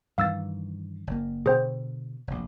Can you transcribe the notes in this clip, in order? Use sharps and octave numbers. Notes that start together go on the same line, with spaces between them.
G2 D#3 E3 F5 E6 A6
F#1 A#3
B2 D3 G#4 C5 G5
F1 A#1